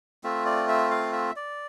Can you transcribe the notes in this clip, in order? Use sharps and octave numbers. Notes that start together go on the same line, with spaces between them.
A3 C4 F4 E5
D5
E5
F5
E5
D5